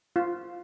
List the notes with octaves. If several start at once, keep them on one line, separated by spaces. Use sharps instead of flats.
F4